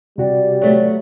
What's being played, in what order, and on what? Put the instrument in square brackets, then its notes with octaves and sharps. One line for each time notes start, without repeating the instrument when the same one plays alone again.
[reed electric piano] C3 F#4 G4 [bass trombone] G3 [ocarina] D5
[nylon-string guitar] F#3 A3 B3